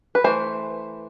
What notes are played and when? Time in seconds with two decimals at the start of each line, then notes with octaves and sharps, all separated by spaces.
0.15 B4
0.24 E3 A3 C5